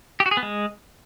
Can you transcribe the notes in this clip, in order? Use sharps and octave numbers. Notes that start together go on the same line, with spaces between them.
G4
F#4
G#4
B3
G#3